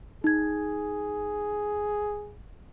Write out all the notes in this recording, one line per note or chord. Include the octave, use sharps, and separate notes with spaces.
D#4 G#4 G#6